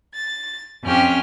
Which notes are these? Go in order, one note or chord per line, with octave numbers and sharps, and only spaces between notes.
A6
F2 C#4 G4 F6